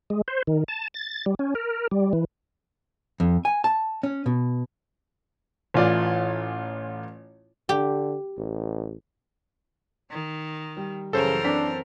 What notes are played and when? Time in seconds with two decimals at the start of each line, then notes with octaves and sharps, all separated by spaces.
0.10 G#3
0.28 C5
0.47 D#3
0.68 A5
0.94 A6
1.26 G3
1.39 C#4
1.55 A#4
1.91 G3
2.13 E3
3.20 F2
3.45 G#5
3.64 A5
4.03 C#4
4.26 B2
5.74 A1 E3 F4 D5
7.69 D3 G4
8.38 A1
10.11 D#3 D#4
10.77 G3
11.13 F#2 C#3 E3 A4 A#4 C5
11.44 C4 D4 A5 B6